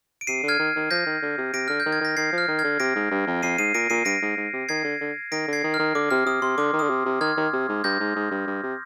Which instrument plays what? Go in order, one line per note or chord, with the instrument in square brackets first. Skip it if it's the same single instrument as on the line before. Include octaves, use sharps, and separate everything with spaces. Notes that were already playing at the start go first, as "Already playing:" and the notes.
[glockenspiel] D7
[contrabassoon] C3 [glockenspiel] C7 D#7
[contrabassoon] D3
[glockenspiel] F6 G#6
[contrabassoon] D#3
D#3
[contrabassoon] F3 [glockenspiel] G6 A#6
[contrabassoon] D#3
D3
C3
[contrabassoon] C3 [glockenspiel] A#6 D7
[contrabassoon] D3 [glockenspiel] F6
[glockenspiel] G6
[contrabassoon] D#3
[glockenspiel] G#6
[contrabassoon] D#3 [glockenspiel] A#6
[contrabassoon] D#3 [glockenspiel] G#6 C7
[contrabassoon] F3
[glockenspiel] F6
[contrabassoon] D#3
[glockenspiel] F6 G#6
[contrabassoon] D3
[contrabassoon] C3 [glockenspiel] A#6 D7
[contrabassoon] G#2
G2
F2
[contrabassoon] F2 [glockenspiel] C7 D#7
[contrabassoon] G#2 [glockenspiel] C7 D#7
[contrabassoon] A#2 [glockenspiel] A#6 D7
[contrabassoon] A#2 [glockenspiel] C7 D#7
[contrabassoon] G2 [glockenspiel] A#6 D7
[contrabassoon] G#2
G#2
C3
[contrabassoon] D#3 [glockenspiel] G#6 C7
[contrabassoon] D3
D3
[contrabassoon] D#3 [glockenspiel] A#6 D7
[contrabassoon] D3
[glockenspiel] G#6 C7
[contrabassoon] D#3
[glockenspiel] F6
[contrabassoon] D#3
[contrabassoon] D3 [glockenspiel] D6
[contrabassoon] C3 [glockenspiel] F6
[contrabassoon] C3 [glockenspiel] D#6
[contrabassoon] C3 [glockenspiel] C6
[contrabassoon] D3 [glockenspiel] D6
[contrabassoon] D#3
[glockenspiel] D#6
[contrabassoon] D3
C3
C3
[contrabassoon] D#3 [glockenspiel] F6 G#6
[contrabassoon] D#3
C3
G#2
[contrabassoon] G2 [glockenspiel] G6 A#6
[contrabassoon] G#2
G#2
G2
G2
C3